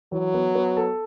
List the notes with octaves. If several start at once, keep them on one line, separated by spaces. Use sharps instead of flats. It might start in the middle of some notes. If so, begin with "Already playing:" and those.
E3 F#3
B3
B3
A4